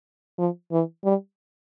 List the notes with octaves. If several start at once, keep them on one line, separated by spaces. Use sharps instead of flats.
F3
E3
G3